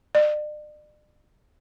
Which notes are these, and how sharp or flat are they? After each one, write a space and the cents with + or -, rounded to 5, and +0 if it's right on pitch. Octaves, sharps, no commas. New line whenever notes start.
D5 +40